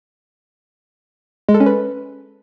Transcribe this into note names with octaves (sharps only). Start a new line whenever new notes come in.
G#3
A4
C#4
B4